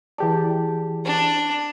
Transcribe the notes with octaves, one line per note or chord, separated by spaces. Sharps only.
E3 E4 G4 G#4 D5 A5
D4